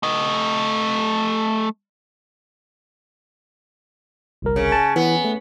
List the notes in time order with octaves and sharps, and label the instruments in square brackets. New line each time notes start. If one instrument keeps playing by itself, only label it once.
[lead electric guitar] A3 D#5
[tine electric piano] G1 C2 A#4
[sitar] C#3
[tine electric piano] A5
[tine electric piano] E3 [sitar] B3
[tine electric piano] A3